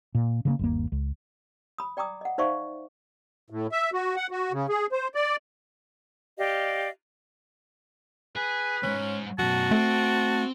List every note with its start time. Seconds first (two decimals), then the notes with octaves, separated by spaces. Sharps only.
0.15 A#2
0.45 C#3 E3 A#3
0.59 G1 D#2 A#3
0.92 C#2
1.78 B5 D#6
1.97 D5 G5 A#5 D6 D#6
2.21 D#5 F#5
2.38 D#4 C5 D5 E5 F5 C#6
3.50 A2
3.72 E5
3.93 F#4
4.16 F#5
4.31 F#4
4.52 C#3
4.69 G#4
4.92 C5
5.15 D5
6.38 G4 D5 D#5 F5
8.36 G#4 B4
8.83 D#2 G#2 C#4
9.39 F#2 B2 F#4 A5
9.71 A3 C4